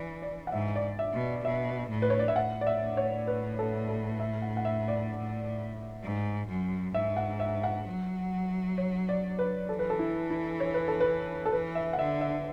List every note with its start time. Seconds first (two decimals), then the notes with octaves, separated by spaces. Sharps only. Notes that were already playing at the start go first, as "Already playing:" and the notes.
Already playing: E3 D5
0.22 D5
0.47 F#5
0.52 G#2 E5
0.76 D5
0.99 E5
1.13 B2
1.45 B2 E5
1.90 A2
2.02 B4
2.10 C#5
2.19 D5
2.28 E5
2.36 A2 F#5
2.61 D5
2.67 E5
2.97 C#5
3.27 B4
3.59 A4
3.89 A4
4.20 E5
4.42 F#5
4.57 F#5
4.65 E5
4.88 D5
6.03 G#2
6.48 F#2
6.94 G#2 E5
7.17 F#5
7.40 E5
7.64 F#5
7.86 F#3
8.78 C#5
9.09 D5
9.39 B4
9.69 E3 A4
9.79 B4
9.90 A4
9.99 E4
10.30 E4
10.60 C#5
10.74 B4
10.88 A4
11.00 B4
11.46 A4
11.52 E3 B4
11.75 E5
11.93 F#5
11.98 D3 E5
12.21 E5